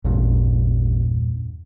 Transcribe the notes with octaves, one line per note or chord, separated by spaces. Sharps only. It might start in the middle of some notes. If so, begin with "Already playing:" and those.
A1 E2 G2 A#2